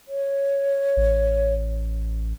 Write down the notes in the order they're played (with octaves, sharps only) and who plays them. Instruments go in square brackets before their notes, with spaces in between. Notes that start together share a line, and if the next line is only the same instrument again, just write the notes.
[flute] C#5
[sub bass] A1